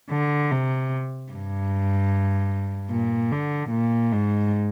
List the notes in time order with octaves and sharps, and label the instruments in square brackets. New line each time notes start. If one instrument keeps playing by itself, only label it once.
[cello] D3
C3
G2
A#2
D3
A#2
G#2